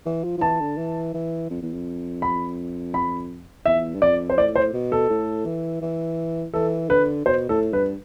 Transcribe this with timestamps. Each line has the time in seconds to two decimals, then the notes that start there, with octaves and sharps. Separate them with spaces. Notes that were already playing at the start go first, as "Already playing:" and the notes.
0.06 E3
0.24 F3
0.38 F3
0.41 E3 A5
0.60 D3
0.78 E3
1.14 E3
1.50 F2
1.62 E2
1.73 F2
2.22 B5
2.94 B5
3.66 E2 E5
3.94 G2
4.01 F2 D5
4.30 C5
4.37 A2 D5
4.56 C5
4.73 B2
4.92 A4
5.10 A2
5.45 E3
5.82 E3
6.54 E3 A4
6.89 D3 B4
7.25 B2 C5
7.49 A2 A4
7.73 G2 B4